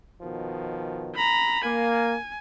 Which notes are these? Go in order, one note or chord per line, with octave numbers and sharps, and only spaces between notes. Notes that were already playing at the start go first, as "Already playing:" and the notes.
B2 D#3 F3
A#5 B5
A#3 G#5